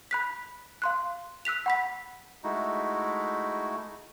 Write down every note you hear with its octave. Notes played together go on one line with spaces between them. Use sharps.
B5 F#6 B6
F5 C6 F#6
E6 F#6 B6 F7
F#5 B5 B6
G#3 A3 D#4 E4 F#4